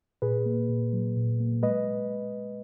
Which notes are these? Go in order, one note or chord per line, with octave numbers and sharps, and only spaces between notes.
A#2 G#4 B4
A#3
A#2
F#3
A#2
A#3
G#3 B4 D#5